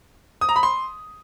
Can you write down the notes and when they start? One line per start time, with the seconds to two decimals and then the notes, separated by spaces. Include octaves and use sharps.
0.41 D#6
0.49 A#5
0.56 B5
0.63 C6